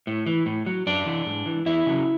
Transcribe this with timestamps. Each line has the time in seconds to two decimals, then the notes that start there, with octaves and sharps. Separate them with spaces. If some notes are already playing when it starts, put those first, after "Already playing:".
0.07 A2
0.26 E3
0.46 A2
0.66 F#3
0.87 F#2 D4 D5
1.06 E3
1.26 G#2
1.46 E3
1.66 E2 E4 E5
1.86 C#3 F#3